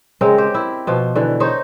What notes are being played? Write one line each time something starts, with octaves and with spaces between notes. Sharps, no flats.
C#3 G#3 C4 A#4
G4 C5
E4
B2 F3
D3 E3
D#4 C5 C#5